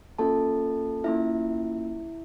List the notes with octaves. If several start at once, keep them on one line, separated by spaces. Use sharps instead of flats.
A#3 C#4 F4 A4 A5
A#3 C#4 E4 F4 E5